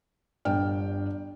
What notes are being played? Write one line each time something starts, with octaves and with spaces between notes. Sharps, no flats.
G1 D4 G5 F6